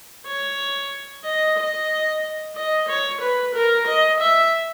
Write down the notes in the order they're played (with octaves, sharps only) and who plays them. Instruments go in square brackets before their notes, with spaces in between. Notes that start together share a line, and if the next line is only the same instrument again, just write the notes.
[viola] C#5
D#5
D#5
D#5
C#5
B4
A#4
D#5
E5